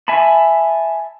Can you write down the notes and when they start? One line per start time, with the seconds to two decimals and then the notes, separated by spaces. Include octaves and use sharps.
0.08 E5 G#5 A5 B5